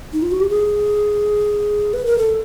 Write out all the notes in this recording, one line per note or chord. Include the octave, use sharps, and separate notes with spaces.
D#4
F4
F#4
G4
G#4
B4
A#4
A4